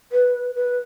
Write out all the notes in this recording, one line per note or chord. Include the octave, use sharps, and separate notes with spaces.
B4
B4